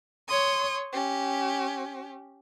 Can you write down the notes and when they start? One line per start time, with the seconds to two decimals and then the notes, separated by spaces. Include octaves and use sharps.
0.29 C#5 C6 C#6 D#6
0.92 C#4 G4